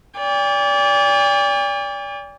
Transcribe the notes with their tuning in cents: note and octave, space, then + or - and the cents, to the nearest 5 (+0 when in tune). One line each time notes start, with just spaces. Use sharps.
D5 -30 G5 +45